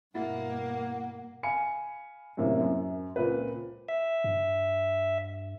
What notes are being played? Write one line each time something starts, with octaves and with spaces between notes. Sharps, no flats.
G2 B2 A#3 E4 F#5
F5 G#5 B5 C#7
F#2 A2 C3 A#3
F#2
C#2 A#2 C4 B4
E5
G2